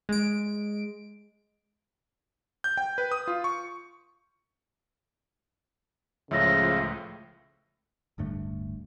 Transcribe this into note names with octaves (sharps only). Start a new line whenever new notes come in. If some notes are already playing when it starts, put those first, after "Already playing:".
G#3 D7
G6
G5
B4
D#6
F4
C#6
C#2 A2 C#3 F3 A3 E5 E6 A#6
D1 G2 D3 A3